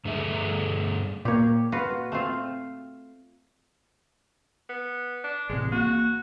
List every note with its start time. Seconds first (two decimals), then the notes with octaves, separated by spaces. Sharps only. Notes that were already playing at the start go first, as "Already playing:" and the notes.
0.05 G2 D3 A3 G#4 E5
1.25 A#2 A#3 G4 C#5
1.72 F4 F#4 B4
2.12 A3 C4 F4
4.69 B3
5.24 D4
5.49 A1 C3 G#3
5.72 A#3 F#4